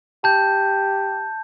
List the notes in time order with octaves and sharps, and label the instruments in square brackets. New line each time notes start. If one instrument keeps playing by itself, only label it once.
[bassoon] G4 [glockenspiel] A5 G6